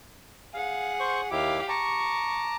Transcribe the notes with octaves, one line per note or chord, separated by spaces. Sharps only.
G#4 F5 F#5
C5 C#6
D#2 E4 G4 F5 D6
A5 A#5 C#6 D6